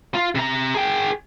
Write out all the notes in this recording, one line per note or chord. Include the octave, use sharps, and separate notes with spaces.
F4
C3 A#5
G#4 G5